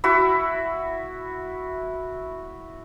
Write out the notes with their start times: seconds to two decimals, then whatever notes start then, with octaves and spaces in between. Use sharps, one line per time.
0.04 E4 F#4